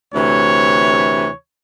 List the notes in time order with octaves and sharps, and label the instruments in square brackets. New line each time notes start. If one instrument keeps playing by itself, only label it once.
[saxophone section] D2 C3 E3 [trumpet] C#5